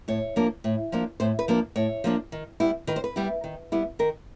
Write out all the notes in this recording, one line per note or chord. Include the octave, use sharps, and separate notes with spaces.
A2 C#5
F3 A#3 D4
A2
F3 A#3 D4
A2 C5
B4
F3 A#3 D4
A2 C#5
F3 A#3 D4
D#3
G3 B3 E4
D#3 B4
C5
B4
G3 B3 E4
D#3
G3 B3 E4
D#3 A#4